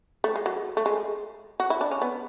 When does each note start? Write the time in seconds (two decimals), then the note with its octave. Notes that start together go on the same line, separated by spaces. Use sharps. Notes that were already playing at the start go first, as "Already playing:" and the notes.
0.24 A3
0.36 G#3
0.46 F#3
0.77 A3
0.86 G#3
1.60 F#4
1.70 E4
1.81 D4
1.91 C#4
2.02 B3